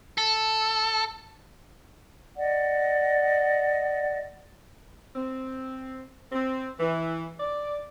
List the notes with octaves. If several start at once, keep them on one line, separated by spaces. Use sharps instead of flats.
A4
D5 D#5 F#5
C4
C4
E3
D5